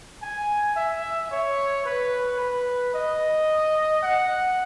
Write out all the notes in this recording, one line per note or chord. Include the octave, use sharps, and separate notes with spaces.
G#5
E5
C#5
B4
B4
D#5
F#5